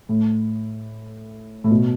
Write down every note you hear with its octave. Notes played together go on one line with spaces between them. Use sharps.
A2
A2
B2